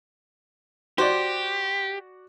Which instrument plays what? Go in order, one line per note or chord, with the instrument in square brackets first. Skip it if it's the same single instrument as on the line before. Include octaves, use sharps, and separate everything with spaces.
[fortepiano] F#4 D5 [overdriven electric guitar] G4 [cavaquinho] C5